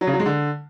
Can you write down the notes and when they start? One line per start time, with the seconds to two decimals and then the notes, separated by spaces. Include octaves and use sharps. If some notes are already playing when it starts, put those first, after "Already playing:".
0.01 F#3
0.07 C#3
0.13 F#3
0.20 G#3
0.26 D3